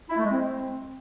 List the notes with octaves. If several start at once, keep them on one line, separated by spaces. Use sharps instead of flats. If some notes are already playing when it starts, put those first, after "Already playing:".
E4
A3
G#3
C4